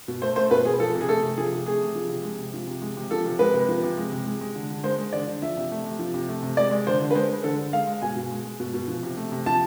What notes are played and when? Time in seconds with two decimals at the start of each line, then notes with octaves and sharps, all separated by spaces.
0.08 B2
0.22 A3 C5
0.36 A3 C5
0.51 B2 B4
0.65 B2 G#4
0.80 F3 A4
0.95 C3
1.01 G#4
1.08 A3 A4
1.23 C3
1.37 F3 G#4
1.52 C3
1.66 A3 G#4
1.81 C3
1.95 F3
2.09 C3
2.24 G#3
2.39 C3
2.54 F3
2.67 C3
2.82 G#3
2.97 C3
3.11 F3 A4
3.25 C3
3.39 G#3 B4
3.54 C3
3.69 F3
3.83 C3
3.98 G#3
4.12 C3
4.26 G#3
4.41 G#3
4.55 D3
4.70 D3
4.84 G#3 C5
4.99 G#3
5.12 D3 D5
5.27 D3
5.42 F3 E5
5.57 C3
5.71 A3
5.85 C3
5.99 F3
6.14 C3
6.28 A3
6.43 C3
6.57 G#3 D5
6.71 G#3
6.86 D3 C5
7.01 D3
7.11 B4
7.15 G#3 C5
7.29 G#3
7.44 D3 A4
7.58 D3
7.73 G#3 F5
7.87 G#3
8.02 B2 G#5
8.16 B2
8.31 G#3
8.45 G#3
8.60 B2
8.74 B2
8.88 F3
9.03 C3
9.17 A3
9.32 C3
9.46 F3 A5